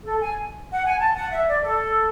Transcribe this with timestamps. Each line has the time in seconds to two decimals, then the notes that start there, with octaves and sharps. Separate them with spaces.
0.03 A4
0.20 G#5
0.71 F#5
0.85 G#5
0.98 A5
1.15 F#5
1.30 E5
1.47 D5
1.62 A4